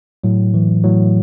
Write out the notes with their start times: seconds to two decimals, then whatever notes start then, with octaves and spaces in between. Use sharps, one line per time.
0.24 A2 F#3
0.54 E3
0.83 A2 F#3